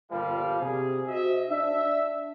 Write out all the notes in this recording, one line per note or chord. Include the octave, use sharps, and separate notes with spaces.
G1 A#2 F3 G3 F5
C3 G#4
F#4 C5 D#5 E5
D4 E5